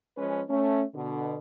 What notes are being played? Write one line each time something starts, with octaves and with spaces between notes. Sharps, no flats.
F3 G#3 C#4 B4
A3 C#4
B2 D3